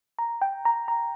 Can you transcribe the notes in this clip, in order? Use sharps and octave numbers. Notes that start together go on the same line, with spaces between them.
A#5
G5
A#5
A#5